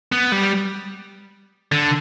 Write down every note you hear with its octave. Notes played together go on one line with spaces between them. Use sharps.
B3
G3
D3